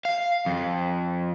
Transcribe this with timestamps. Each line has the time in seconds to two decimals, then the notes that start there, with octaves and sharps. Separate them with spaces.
0.05 F5
0.46 F2